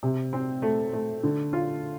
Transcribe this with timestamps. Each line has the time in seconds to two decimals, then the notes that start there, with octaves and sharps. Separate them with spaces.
0.03 C3
0.33 C4
0.62 A3
0.93 A3
1.23 D3
1.53 F4